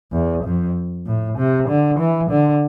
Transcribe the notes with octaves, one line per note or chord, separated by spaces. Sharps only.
E2
F2
A2
C3
D3
E3
D3